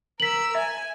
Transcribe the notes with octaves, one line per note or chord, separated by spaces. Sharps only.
A#4 E6 B6 F#7
E5 G#5